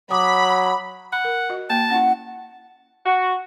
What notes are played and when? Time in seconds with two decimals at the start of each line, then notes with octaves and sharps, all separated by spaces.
0.11 F#3 B5 D6 D#6
1.13 F#5 B5
1.24 A#4
1.50 F#4 D#5
1.70 A#3 G5 A5
1.90 C#4 E4 F#5
3.05 F#4